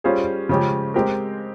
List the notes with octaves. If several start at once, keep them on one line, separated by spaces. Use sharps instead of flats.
G3 C#4 F4 G#4 C5
C#3 F3 G#3 C#4 G4
G#3 C4 G4 A#4